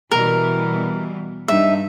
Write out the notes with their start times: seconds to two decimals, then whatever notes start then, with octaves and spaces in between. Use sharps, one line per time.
0.11 B2 E3 G3 A#4
1.48 G2 D#4 E5